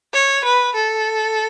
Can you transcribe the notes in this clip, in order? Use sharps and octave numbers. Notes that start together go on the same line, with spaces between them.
C#5
B4
A4